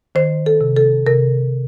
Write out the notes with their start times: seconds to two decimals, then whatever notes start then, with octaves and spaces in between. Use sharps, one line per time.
0.15 D#3 C5
0.46 A4
0.61 C3
0.77 A4
1.07 C3 A#4